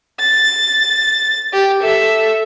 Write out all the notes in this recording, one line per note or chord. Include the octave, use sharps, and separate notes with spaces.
A6
G4
A4 E5